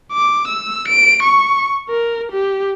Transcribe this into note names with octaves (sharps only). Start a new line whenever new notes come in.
D6
E6
D7
C#6
A#4
G4